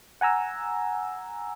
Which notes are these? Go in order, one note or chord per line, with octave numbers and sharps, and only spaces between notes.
F#5 G#5 A#5 E6